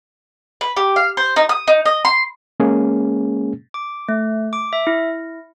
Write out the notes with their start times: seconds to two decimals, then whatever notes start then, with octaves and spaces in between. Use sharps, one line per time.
0.61 B4
0.77 G4
0.96 F5
1.17 C5
1.36 D#4
1.49 D#6
1.67 D#4
1.86 D#5
2.05 C6
2.60 G#3 A#3 C#4 G#4
3.74 D6
4.09 A3
4.53 D6
4.73 E5
4.87 E4